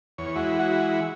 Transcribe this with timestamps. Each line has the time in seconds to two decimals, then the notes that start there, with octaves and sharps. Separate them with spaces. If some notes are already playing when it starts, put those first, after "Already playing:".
0.18 E2 C#5
0.36 E3 G#3 E4 F#4
0.59 F#4